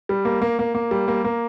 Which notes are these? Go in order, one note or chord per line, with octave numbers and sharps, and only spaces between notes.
G3
A#3
A#3
A#3
A#3
G3
A#3
A#3